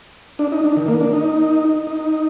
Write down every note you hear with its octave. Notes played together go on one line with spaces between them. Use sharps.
D4
D#4
D4
D#3
A#3
D4
D#4
D#4